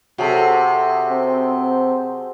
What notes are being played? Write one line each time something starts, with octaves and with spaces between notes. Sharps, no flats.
C3 F#3 G#4 A4
C4